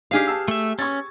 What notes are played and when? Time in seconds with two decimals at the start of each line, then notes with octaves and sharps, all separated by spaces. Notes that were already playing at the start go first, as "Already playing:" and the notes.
0.11 D4 D#4 G4 G#4 F5 F6
0.27 A5 E6
0.48 A3 E5
0.79 C#4 C#6 G#6 A6